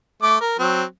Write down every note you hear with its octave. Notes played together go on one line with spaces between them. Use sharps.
A3 D6
A#4
F#3 C4